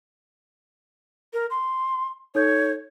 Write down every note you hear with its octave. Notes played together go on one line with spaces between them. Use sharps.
A#4
C6
D#4 A4 C#5 G6